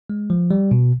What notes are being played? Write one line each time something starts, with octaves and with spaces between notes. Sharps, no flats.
G#3
F3
G3
B2